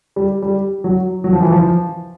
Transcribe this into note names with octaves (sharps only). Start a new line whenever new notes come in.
G3
G3
F#3
F#3
F3
E3
F3